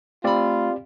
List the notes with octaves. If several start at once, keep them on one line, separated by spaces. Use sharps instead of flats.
A3 C4 F4 G4 D5 B5